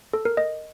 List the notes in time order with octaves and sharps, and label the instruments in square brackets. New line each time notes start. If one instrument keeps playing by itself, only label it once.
[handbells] A4
A#4
D#5